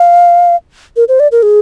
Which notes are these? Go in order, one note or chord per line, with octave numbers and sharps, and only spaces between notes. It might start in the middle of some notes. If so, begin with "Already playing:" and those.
Already playing: F5
A#4
C5
D5
A#4
G#4